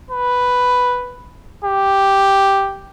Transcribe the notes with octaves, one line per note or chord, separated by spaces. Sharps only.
B4
G4